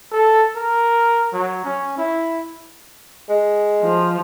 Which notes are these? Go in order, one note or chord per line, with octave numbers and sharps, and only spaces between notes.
A4
A#4
F#3
C#4
E4
G#3
F3